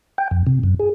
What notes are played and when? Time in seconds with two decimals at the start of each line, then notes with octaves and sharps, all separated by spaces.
0.18 G5
0.31 F2
0.47 C3
0.63 F#2
0.80 G#4